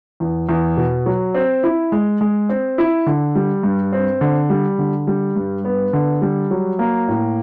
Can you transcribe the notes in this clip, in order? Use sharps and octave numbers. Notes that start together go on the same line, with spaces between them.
E2
E2
B2
F#3
C4
E4
G#3
G#3
C4
E4
D3
G3
G2
C4
D3
G3
D3
G3
G2
B3
D3
G3
F#3
A#3
A2